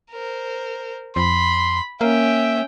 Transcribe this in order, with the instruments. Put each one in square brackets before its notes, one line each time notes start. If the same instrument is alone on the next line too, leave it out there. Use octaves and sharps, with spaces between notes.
[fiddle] A#4 C5
[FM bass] F2 [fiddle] B5 [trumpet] C6
[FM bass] A#3 [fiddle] C#4 G5 [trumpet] E5